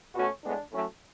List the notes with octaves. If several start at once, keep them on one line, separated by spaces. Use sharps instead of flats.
B2 A3 C#4 F#4
A2 G#3 B3 D4
A2 F#3 A3 C#4